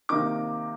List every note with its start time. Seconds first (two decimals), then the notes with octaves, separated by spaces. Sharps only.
0.09 C3 D#3 A#3 D#4 D6